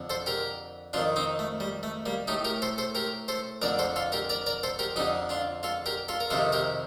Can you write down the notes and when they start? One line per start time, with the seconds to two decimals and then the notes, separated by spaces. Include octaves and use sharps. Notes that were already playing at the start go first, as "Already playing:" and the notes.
Already playing: F2 D3
0.10 A4 C5
0.26 G4 A#4
0.93 F2 D#3 D4 F4
1.16 C4 D#4
1.39 A3
1.60 G3
1.83 A3
2.06 G3 A#3
2.27 A2 D#4 G4
2.45 G4 A#4
2.62 A4 C5
2.78 A4 C5
2.95 G4 A#4
3.28 A4 C5
3.62 F2 D3 A#4 D5
3.79 A4 C5
3.96 F4 A4
4.12 G4 A#4
4.29 A#4 D5
4.46 A#4 D5
4.63 A4 C5
4.79 G4 A#4
4.96 F2 D3 D#4 G4
5.29 D4 F4
5.63 F4 A4
5.86 G4 A#4
6.08 F4 A4
6.20 A#4
6.30 F2 C3 D#3 F4 A4
6.52 G4 A#4